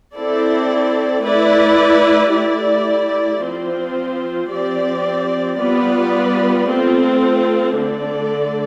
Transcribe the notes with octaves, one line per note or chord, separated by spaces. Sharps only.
C4 E4 A4 D5
A3 E4 B4 D5
A3 E4 G4 D5
F3 C4 F4 C5
F3 C4 G4 D5
G3 B3 F4 B4 D5
A3 C4 F4 A4
D3 A3 D4 A4 D5